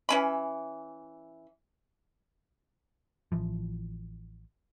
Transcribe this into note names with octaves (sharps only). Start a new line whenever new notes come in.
E3 C#4 B5
A1 E3 F3